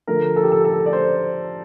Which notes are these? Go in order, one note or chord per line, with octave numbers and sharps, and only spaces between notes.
D3 F3 A3 A#4
A4
G4
A4
A4
D5
C5